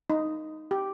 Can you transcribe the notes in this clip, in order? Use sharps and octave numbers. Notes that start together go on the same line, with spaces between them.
D#4
G4